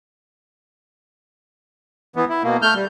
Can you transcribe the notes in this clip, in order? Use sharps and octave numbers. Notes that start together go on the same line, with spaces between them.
E3 B3
E4
B2 A#3
A3 F6 G6
G3